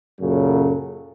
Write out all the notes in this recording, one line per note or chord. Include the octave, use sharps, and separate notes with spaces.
F#2 A#2 C#3 F#3 A4